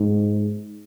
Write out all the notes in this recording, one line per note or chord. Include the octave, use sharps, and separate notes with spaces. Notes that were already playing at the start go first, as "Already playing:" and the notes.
Already playing: G#2